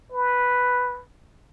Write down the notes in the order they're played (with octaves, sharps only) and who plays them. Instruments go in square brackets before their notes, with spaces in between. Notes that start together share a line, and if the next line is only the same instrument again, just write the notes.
[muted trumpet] B4